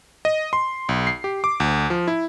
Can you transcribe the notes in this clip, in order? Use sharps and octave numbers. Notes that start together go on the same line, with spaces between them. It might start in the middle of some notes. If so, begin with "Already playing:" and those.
D#5
C6
B1
C7
G4
D6
D2
F3
E4